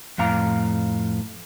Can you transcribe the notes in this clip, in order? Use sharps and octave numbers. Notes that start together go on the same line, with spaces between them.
F2 A2 F5 A#5